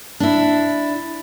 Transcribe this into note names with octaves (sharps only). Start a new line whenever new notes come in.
D4 E4